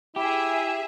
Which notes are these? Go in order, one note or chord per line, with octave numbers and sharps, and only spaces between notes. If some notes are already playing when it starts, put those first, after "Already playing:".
E4 G4 G#4 E5